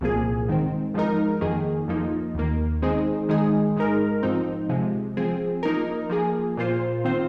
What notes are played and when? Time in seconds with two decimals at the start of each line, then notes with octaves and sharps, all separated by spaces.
0.01 C2 A#2 F3 A#3 G#4
0.48 G#2 D#3 C4
0.94 G#2 F3 G#3 D#4 A#4
1.41 F2 D#3 A#3 G#4
1.88 F2 F3 A#3 D#4
2.35 D#2 D#3 A#3
2.82 D#3 G#3 C4 D#4 G#4
3.29 D#3 G#3 D#4 G#4
3.76 G#2 G#3 D#4 A#4
4.23 G#2 F3 C4 D#4
4.69 C3 F3 G#3
5.17 F3 C4 G#4
5.63 F3 A#3 D#4 A#4
6.10 F3 A#3 G#4
6.57 A#2 A#3 F4 C5
7.04 D#3 C4 F4 C5